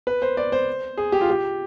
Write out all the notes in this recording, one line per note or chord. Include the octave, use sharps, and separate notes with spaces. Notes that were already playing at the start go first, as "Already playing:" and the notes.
B4
C5
D5
C5
G#4
G4
F4
G4